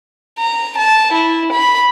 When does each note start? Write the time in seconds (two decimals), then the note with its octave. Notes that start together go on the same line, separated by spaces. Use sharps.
0.39 A#5
0.78 A5
1.13 E4
1.52 B5